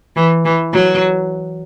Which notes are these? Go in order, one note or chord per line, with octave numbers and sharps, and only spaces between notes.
E3
E3
F#3